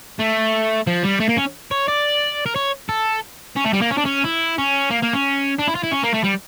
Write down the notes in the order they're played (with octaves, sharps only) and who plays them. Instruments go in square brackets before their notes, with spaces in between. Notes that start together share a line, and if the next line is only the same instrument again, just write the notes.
[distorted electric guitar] A3
F3
G3
A3
A#3
C#4
C#5
D5
A#4
C#5
A4
C#4
A3
G3
A#3
C#4
D4
C#4
E4
C#4
A#3
A#3
C#4
D4
E4
F4
E4
C#4
A#3
A3
G3